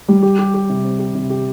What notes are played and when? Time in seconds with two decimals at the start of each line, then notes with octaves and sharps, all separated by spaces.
0.08 G3
0.23 G4
0.39 G4
0.54 G4
0.69 C3
0.84 C4
0.99 G4
1.15 C3
1.30 G4